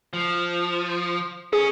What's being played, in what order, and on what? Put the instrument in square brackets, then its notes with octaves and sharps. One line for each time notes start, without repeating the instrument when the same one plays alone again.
[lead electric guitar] F3
[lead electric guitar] C#4 [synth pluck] G#4